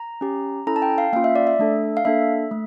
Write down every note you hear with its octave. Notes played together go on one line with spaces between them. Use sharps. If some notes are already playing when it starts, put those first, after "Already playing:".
Already playing: A#5
C#4 G4
C#4 E4 A4 A#5
A5
G5
F5
A#3 C#4 F4 F5
E5
D5
E5
A3 D4 A4
F5
A#3 D4 A4 E5
A3